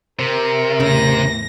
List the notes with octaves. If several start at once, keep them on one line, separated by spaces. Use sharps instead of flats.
C3 A#4
E2 A2 C#3 A#6